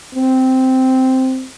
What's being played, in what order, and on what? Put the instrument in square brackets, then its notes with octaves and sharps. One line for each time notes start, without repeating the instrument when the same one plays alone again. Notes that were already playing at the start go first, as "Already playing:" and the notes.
[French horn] C4